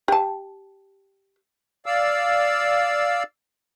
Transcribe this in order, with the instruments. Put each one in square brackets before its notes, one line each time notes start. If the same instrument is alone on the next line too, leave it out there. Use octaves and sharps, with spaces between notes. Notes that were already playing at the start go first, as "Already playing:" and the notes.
[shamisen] G4 A5
[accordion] D5 F5 E6